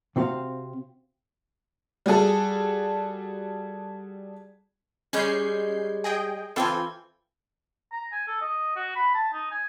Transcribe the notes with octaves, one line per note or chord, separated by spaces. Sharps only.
C3 C4 F#4 C5 F5
G3 F#4 G#4 A4
G3 G#3 C#4 C#5 G6 C7
G#4 D#5 G5
E3 C4 F4 A4 G5 G#5
A#5
G#5
A4
D#5
F#4
B5
A5
D#4
G#5